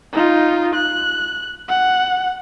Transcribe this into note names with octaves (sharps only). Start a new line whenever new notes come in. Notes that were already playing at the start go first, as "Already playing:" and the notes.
D#4 F4
F#6
F#5